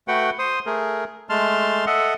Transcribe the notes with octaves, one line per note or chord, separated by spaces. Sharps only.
A3 F#4 B4 F#5 G5
C5 C6 D#6
A3 G#4 A#4
G#3 A3 A5 C6 F6
A4 D#5 E5 F#5